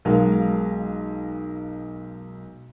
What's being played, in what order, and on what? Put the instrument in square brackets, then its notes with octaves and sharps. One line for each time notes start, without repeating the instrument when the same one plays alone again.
[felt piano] B1 G#3 A#4 F5